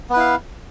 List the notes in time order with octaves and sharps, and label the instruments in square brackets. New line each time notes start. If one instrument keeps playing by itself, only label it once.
[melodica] B3
B4
E4
F5